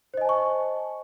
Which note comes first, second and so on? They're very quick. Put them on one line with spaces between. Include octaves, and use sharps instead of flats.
C5 D#5 G#5 A5 C#6